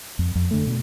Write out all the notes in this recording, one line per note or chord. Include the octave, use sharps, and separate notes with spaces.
F2
F2
D3 A3
B2